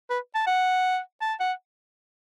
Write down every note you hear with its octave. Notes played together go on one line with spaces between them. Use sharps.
B4
A5
F#5
A5
F#5